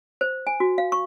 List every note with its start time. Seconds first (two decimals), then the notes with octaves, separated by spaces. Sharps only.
0.21 C5
0.47 G#5
0.60 F#4
0.78 F5
0.92 C#6